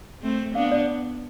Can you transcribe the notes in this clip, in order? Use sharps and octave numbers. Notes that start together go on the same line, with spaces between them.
A3 C4
B3 D4 F5
D5